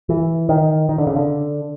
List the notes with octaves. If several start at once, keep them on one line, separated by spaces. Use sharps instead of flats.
E3
D#3
D#3
D3
C#3
D3